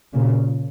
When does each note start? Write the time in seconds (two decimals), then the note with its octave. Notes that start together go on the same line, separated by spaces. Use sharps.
0.13 A#2 C#3